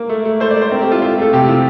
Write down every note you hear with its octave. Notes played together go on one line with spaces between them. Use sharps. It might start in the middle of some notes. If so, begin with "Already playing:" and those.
Already playing: A#3
A3
A3
A3 C5
D5
A3
C5
C4 A#4
G4
A3 F4
A3 F4
A3 A4
C3 G4
F3